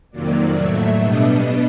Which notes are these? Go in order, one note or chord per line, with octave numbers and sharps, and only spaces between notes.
F2 C3 D#3 F#3 A#3 D5
A2 F#3 A3 E5
B2 G3 B3 D4 D#5